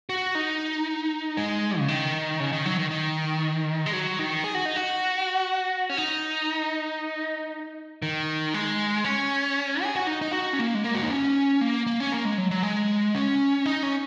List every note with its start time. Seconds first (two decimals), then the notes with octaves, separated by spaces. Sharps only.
0.09 F#4
0.35 D#4
1.37 G#3
1.79 C#3
1.88 D#3
2.40 C#3
2.52 D#3
2.66 F#3
2.78 D#3
2.91 D#3
3.86 G#3
3.93 F#3
4.19 D#3
4.44 G#4
4.55 F#4
4.65 D#4
4.76 F#4
5.89 C#4
5.97 D#4
8.02 D#3
8.54 G#3
9.04 C#4
9.83 G#4
9.96 F#4
10.07 D#4
10.21 D#4
10.33 F#4
10.53 C#4
10.59 A#3
10.75 G#3
10.84 A#3
10.95 F#4
11.02 D#4
11.10 C#4
11.61 A#3
11.87 A#3
12.00 C#4
12.12 A#3
12.25 G#3
12.38 F#3
12.51 F#3
12.63 G#3
13.15 C#4
13.66 D#4
13.83 C#4